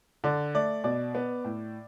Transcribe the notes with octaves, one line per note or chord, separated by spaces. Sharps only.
D3 D5
A3 D5
B2 D5
B3
A2